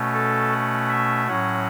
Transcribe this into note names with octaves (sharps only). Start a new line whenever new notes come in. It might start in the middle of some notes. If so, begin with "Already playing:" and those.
Already playing: B2 A3 C#4
A4
F#5
E5
A2 F#3 C#4 F#5